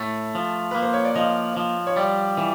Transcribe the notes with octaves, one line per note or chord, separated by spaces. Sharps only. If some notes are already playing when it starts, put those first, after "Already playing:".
Already playing: A2 A3
F3
A#3 B4
C5
C#5
D5
F3 D#5
F3
C#5
G3 D5
E3